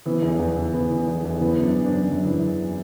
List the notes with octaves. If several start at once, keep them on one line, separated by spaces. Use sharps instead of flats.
E3 B3
E2
E2
E3
E3 B3
E3
E2
E2
E3 B3
F#2
D4
F#2
D4
F#2
F#2
E3